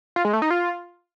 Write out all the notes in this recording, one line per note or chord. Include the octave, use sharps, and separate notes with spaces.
F4
G#3
A3
D#4
F4